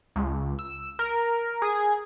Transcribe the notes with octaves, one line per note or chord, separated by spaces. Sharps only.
C#2
E6
A#4
G#4